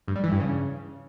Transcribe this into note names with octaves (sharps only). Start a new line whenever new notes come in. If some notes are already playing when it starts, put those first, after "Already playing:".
G2
G3
E3
G2
C#3